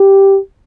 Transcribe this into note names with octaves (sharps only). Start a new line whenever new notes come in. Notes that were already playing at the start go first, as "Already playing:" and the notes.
Already playing: G4